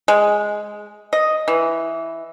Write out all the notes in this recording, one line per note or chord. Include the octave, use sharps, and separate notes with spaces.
G#3
D#5
E3